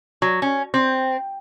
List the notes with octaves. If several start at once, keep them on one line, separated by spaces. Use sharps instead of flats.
F#3
C#4
C4